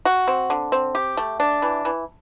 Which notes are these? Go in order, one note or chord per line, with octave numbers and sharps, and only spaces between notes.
F#4
C4
D3
C4
G4
A3
D4
E3
E3